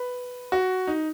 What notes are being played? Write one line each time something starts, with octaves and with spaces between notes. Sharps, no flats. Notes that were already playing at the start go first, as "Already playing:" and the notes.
Already playing: B4
F#4
D#4